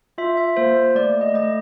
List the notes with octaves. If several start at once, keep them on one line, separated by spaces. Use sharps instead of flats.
F4 E5
E5
A#3 C5
A3 D5
D#5
A3 D#5